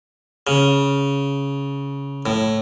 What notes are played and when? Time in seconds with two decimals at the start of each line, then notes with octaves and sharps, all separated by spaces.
0.47 C#3
2.26 A2